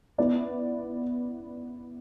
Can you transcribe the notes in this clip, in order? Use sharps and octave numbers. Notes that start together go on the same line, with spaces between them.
B3 E4 B4 D5